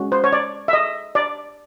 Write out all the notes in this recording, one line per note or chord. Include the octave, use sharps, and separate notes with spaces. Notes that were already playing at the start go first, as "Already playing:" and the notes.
Already playing: G#3 C#4 F#4
C5
C#5
D5
E5
D#5
D5